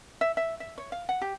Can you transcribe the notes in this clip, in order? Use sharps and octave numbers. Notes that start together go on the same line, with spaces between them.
E5
E5
E5
C#5
F5
F#5
G4